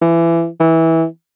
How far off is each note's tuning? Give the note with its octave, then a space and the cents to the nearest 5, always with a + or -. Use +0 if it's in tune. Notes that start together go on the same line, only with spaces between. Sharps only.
E3 +25
E3 -20